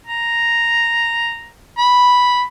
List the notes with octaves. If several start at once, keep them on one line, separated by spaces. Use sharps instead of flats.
A#5
B5